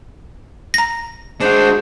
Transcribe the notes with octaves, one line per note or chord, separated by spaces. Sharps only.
A#5 A#6
G#3 D4 F#4 C5